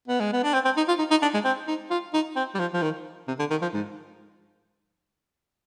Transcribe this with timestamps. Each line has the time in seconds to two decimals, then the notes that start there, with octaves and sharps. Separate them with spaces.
0.08 B3
0.20 G#3
0.33 B3
0.43 D4
0.54 C4
0.65 C4
0.77 D#4
0.88 F4
0.99 D#4
1.11 D#4
1.22 D4
1.34 G#3
1.45 C4
1.68 D#4
1.91 F4
2.14 D#4
2.36 C4
2.55 G3
2.59 F3
2.74 F3
2.82 D#3
3.28 C3
3.39 D3
3.50 D#3
3.62 F3
3.74 G#2